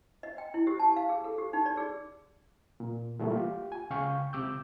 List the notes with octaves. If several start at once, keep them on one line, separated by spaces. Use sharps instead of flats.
D#5
G5
E4
G4
A5
F5
G#4
A4
G4
D#4
D5
G#4
A#2
A#2 E3 G3 A3 A#3
F4 G4
G#5
C#2 C#3 F5 G5 C#6
C#2 C3 D6 E6 G6